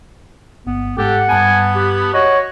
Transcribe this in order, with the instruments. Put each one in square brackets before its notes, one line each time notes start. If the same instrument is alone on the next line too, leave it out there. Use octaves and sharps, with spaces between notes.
[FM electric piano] G1 [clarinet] B3
[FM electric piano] G#2 [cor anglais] G4 [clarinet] A4 [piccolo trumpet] F#5
[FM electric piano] G2 A5 G#6 [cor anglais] B3 [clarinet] G#5
[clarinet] G4
[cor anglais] F#4 [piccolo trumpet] C#5 [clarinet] D#5